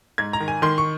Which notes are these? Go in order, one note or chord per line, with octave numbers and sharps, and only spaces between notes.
G#2 G#6
A#5
D#3
G#5
D#3 C6
C#6